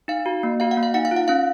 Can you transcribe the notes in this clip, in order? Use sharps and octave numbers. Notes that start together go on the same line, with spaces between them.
D#4 F5
F#4
A#3
F#4 F5
F#5
A#3
F5
D#4 F#5
F5
F4
F#5
C#4 F5